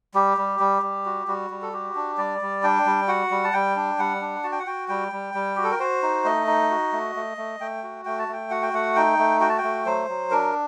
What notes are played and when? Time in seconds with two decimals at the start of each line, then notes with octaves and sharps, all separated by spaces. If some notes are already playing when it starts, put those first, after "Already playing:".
0.14 G3 G4
0.38 G3
0.60 G3
0.82 G3
1.06 F#4
1.28 G3 F#4
1.50 G3
1.62 A4
1.73 F#4 G4
1.95 D4
2.18 G3 D5
2.41 G3
2.63 D4 G5
2.86 G3
3.08 F#4 F#5
3.31 G3
3.44 A5
3.53 G3 G5
3.76 D4
3.99 G3 F#5
4.21 D4
4.44 F#4 A5
4.52 G5
4.59 F#5
4.67 F#4 G5
4.89 G3 G5
5.12 G3
5.34 G3
5.56 F#4 G4
5.63 A4
5.71 A#4
5.79 F#4 C5
6.03 D#4
6.25 A3 D#5
6.47 D#4
6.70 F#4
6.93 A3
7.16 A3
7.37 A3
7.60 A3 G5
7.83 F#4
8.05 A3 G5
8.19 A5
8.28 A3 G5
8.50 F#4 F#5
8.62 G5
8.73 A3 F#5
8.96 D#4 G5
9.19 A3
9.40 F#4 G5
9.49 A5
9.58 G5
9.63 A3
9.86 F#3 C5
10.09 F#3
10.31 D4 A#4